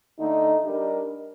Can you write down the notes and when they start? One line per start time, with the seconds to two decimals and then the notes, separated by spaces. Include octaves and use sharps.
0.18 D3 A3 D#4
0.64 G3 D4 G4 A#4 D#5